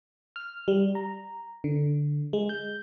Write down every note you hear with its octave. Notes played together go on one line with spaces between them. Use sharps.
F6
G3
A#5
D3
G#3
G6